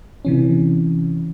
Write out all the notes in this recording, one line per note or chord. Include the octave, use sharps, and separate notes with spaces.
C3 E3 C#4